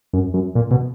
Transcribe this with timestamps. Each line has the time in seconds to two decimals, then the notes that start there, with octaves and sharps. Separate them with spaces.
0.13 F#2
0.34 F#2
0.55 A#2
0.71 B2